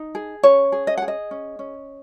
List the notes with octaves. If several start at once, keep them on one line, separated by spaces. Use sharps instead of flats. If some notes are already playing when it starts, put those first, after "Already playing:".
Already playing: D#4
G#4
C#4 C#5
G#4
D#5
G#4 F#5
D#5
C#4
C#4